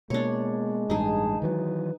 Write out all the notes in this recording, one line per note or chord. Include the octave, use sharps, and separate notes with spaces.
B2 G#3 A#3 D4 C#5
A1 G2 D#4 G#4 A5
D#3 E3 F#3 B4